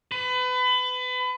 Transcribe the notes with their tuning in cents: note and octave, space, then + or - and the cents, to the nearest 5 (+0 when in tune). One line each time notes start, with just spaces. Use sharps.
B4 +30